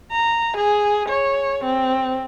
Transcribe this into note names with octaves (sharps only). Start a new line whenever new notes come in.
A#5
G#4
C#5
C4